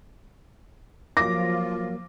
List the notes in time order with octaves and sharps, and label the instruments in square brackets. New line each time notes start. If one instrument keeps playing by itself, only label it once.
[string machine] F3 F4 [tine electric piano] F#3 A#3 [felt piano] D6 [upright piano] A#6